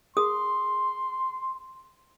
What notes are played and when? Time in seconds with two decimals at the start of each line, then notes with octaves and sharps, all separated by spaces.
0.17 G#4 A#4 C6 D#6